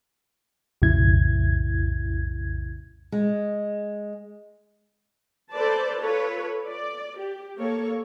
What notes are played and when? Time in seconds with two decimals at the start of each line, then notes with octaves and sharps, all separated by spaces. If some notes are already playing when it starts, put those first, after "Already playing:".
0.82 B1 F2 A2 C#3 E4 G#6
3.12 G#3
5.53 A4 B4 C5 D5 A5
5.99 F4 A4 B4 C#5
6.68 D5
7.19 G4
7.59 A#3 A4 C#5